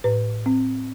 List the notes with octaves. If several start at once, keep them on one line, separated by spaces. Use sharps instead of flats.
A2 B4
C4